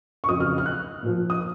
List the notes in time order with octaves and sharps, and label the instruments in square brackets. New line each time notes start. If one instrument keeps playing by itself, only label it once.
[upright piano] C#6
F2 C#3 F#3 D#6
F6
F6
F#6
A#2 F3
D#6